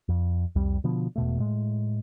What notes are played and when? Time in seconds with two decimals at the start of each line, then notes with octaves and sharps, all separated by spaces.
0.09 F2
0.56 C2 F2 G3
0.84 B2 D3 F3 B3
1.16 E1 B2 A3
1.40 A2 G#3